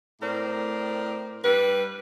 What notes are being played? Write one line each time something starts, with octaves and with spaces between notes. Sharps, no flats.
A2 C4 A#4 C5 D5
G2 G3 B4